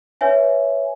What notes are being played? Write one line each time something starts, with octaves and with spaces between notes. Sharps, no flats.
B4 C#5 E5 G#5